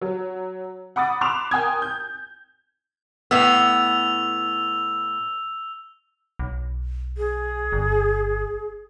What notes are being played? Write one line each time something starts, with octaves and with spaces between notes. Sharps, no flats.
F#3
F#5 B5 D6 D#6 A6
B5 C6 D6 F#6 E7 F7
A#4 G5 G#5 D#6 G#6
G6
A2 B3 E6 F7
B1
G#4
G1